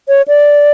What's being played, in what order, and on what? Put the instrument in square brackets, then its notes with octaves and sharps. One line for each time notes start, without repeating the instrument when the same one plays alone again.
[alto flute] C#5
D5